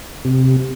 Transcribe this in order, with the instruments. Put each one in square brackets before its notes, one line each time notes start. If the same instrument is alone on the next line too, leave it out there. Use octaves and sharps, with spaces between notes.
[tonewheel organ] C3